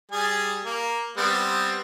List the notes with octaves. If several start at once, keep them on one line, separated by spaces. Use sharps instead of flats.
G3 G#4 G#5
A#3
G3 B3 C4